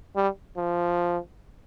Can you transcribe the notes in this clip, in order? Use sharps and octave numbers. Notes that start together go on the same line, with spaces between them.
G3
F3